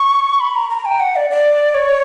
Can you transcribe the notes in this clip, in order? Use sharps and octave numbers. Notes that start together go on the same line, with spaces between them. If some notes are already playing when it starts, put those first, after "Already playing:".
Already playing: C#6
B5
A#5
A#5
G5
F#5
D5
D5
C#5